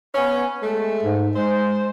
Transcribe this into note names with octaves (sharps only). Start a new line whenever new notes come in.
B3 C#4
G#3 A3
G#2
G#3 C5